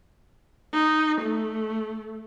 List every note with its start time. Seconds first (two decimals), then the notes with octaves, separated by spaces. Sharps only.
0.74 D#4
1.21 A3